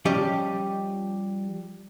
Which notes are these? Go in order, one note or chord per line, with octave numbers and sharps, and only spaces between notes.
F3 G3 C#4 G4 D#5